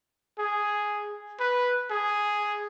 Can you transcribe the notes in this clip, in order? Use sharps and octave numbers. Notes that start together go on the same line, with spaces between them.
G#4
B4
G#4